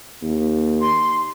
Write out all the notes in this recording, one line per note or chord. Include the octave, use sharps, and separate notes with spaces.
D#2
C6